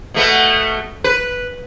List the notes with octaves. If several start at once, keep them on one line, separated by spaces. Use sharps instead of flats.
B2 A3 B3
B4